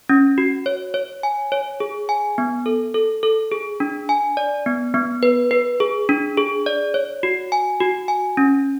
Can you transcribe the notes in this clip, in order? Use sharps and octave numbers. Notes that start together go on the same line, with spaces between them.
C#4
F#4
C#5
C#5
G#5
C#5
G#4
G#5
B3
A4
A4
A4
G#4
D4
G#5
D5
B3
B3
B4
B4
G#4
D4
G#4
D5
C#5
F#4
G#5
F#4
G#5
C#4